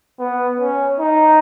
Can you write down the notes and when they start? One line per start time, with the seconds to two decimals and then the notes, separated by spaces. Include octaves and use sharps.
0.19 B3
0.59 C#4
1.00 D#4